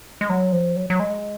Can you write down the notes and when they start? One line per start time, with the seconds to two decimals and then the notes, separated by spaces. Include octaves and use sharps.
0.21 G#3
0.29 F#3
0.52 F3
0.76 F#3
0.90 F#3
1.00 G#3